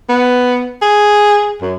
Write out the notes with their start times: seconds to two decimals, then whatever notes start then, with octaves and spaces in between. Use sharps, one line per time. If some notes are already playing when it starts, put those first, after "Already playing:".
0.09 B3
0.82 G#4
1.62 F#2